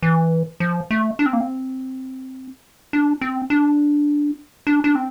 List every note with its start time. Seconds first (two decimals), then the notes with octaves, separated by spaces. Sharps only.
0.03 E3
0.60 F3
0.91 A3
1.19 D4
1.26 C4
1.33 A#3
1.40 C4
2.93 D4
3.21 C4
3.50 D4
4.67 D4
4.84 D4
4.95 C4